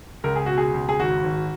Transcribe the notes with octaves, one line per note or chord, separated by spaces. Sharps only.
C#2 A#4
G#4
B2 F#4
G#4
C#2
G#4
G#1 F#4
G#1